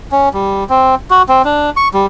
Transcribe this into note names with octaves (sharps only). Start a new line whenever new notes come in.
C#4
G3
C4
F#4
C4
D4
C#6
G3